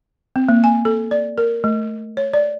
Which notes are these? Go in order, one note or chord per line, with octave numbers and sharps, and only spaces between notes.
C4
A#3
G#5
A4
D5
A#4
A3
C#5
D5